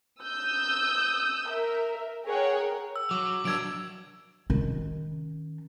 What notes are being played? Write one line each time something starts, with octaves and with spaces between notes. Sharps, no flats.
D#6 E6 G6
A#4 E5
G#4 A#4 C#5 F#5 G5
E6
F#3 D6
F#3 D4 E6 G#6 D7
D#3 C#4